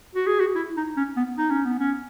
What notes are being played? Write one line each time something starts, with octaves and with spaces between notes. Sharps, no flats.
F#4
G#4
F#4
E4
D#4
C#4
B3
D#4
C#4
B3
C#4